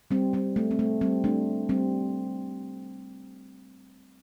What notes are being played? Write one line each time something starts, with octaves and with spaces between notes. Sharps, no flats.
G3 C4
G3 C4
A3
C4
A3
G3 C4
A3 D4
G3 C4